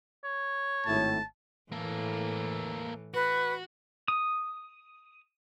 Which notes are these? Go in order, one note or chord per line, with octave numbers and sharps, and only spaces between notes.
C#5
G#1 A2 A5
A2 E3 A#3 A4
F#4 B4
D#6